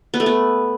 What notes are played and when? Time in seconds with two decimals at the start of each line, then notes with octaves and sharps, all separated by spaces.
0.14 B3
0.20 A3
0.26 B3